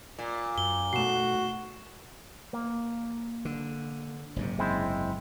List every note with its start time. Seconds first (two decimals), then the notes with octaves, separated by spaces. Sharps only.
0.19 A#2
0.58 F#2 G7
0.93 B2 A3 F#4 C7 E7
2.53 A#3
3.45 D3
4.36 F#1 G#2 C3
4.59 G#3 C4 E4